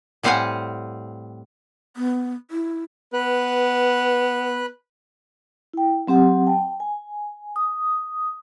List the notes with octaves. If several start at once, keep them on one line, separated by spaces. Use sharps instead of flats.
A2 G3 C4 F5 F#5 G#5
B3
E4
B3 B4 F#6
E4 G5
F#3 C4 G4 F#5 C6
G5 A5
G#5
D#6